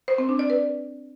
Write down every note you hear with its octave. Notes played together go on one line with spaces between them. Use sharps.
C5
C4
D4
D5
B4